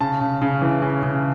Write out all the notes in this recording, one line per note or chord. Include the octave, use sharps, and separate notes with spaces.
C#3 A5
C#3
C#3
E3
C#3
C#3